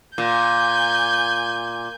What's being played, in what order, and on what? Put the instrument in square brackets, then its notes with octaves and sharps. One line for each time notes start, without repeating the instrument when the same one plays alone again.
[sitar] A#2 [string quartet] G#5 G6